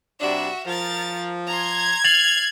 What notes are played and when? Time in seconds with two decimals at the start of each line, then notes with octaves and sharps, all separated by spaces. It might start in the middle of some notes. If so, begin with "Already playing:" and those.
0.20 C3 G3 D4 F#4 E5
0.66 F3 A#4 A6
1.46 A#5 C6 G#6
2.04 F6 A6 C7 F7 F#7